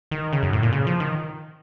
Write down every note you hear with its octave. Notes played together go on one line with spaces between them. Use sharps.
D#3
C#3
F#2
A2
A#2
C#3
F3
D#3